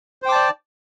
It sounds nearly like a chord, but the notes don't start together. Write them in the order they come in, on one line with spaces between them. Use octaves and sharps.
C5 G5 D6 A5 D5